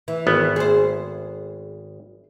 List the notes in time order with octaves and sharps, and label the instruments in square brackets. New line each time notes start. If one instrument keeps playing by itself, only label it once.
[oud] E3
[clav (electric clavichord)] G#1 B3
[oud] G#4 C5